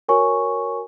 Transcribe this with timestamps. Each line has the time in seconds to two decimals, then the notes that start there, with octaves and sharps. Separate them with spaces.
0.09 F#4 A#4 C#5 G#5 C#6